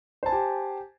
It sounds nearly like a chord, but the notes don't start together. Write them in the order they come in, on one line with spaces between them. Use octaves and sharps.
C5 A5 G#5 G4